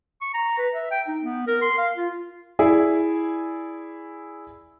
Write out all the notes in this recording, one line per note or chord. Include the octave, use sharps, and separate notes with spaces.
C#6
A#5
B4
E5
G5
D#4
B3
A#4
C6
F5
F4
E4 G#4 D5